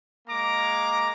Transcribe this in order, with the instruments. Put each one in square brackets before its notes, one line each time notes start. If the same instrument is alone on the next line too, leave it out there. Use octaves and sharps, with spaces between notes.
[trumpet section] G#3 A#3 A#5 D6